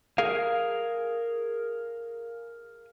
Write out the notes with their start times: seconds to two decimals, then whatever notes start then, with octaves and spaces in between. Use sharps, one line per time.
0.18 G#4 A#4 F5